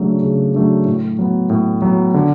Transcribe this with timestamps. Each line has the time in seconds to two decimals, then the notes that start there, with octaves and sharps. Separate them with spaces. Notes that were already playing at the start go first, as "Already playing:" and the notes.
Already playing: C#3 F#3 A3 D4
0.23 C#3
0.54 F#3 A3 D4
0.86 A2
1.19 F#3 B3
1.50 A2
1.82 F#3 B3
2.14 D3